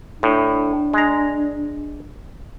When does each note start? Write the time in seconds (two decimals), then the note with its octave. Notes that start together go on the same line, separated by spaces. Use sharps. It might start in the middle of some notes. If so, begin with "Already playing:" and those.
0.23 A2 D4
0.94 G#3 A#5